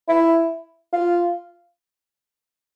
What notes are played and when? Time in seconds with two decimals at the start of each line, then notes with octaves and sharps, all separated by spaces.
0.08 E4
0.93 F4